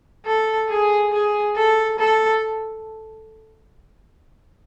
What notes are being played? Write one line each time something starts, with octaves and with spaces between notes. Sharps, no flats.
A4
G#4
G#4
A4
A4